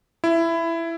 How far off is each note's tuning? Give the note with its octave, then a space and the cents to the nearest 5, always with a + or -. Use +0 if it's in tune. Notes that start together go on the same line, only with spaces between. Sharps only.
E4 +15